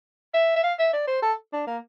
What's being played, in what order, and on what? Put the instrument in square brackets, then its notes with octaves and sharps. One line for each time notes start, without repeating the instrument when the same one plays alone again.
[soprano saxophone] E5
E5
F5
E5
D5
C5
A4
D4
A#3